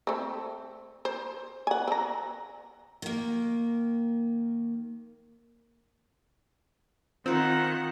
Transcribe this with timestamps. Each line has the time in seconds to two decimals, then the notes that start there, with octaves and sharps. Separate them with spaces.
0.07 A3 C4
1.05 C5
1.67 F#5 G#5
1.88 C4 A#5
3.02 D#3 A#3
7.26 D#3 C4 D#4 F4 F#5 A#5